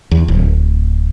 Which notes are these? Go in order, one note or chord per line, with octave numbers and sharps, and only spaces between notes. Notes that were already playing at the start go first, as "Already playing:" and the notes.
E2
D1